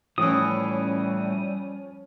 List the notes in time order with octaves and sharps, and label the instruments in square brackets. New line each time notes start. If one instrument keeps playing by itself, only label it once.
[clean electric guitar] A2 E3 [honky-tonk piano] F3 C#4 [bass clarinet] G3 [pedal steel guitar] D#6